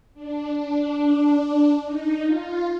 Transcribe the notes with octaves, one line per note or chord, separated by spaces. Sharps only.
D4
D4
D#4
F4